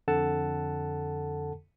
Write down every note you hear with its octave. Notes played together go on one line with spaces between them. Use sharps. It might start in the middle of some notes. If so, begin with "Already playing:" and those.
F2 D3 A4 F#5 A5